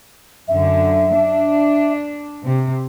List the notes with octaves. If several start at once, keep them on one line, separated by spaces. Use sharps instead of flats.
F#2 D3 E5
D4
C3